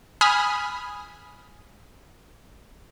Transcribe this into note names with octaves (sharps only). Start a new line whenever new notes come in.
G#5 B5 D#6 F6